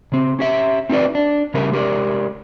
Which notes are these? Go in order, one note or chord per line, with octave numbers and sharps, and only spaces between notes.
C#3 C4
C#4 G4 E5
C4 D#4 F#4 B4 D5
D4
C#3 G3 C#4 G4 A#4 E5
G#3 G4 A#4 D5